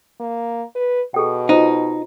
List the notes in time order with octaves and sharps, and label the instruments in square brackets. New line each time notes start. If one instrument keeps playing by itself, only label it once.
[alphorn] A#3
B4
[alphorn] B2 [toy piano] G#4 A4 G5
[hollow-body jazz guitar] D#4 [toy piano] F4 C5